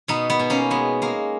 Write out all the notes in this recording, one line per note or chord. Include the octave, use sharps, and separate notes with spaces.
B2 B3 D#4
B3
B2
A#3 C#4
G#3 B3
G#3 A#3